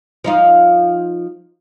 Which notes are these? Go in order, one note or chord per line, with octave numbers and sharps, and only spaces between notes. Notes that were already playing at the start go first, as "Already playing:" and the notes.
F3 D#4 F4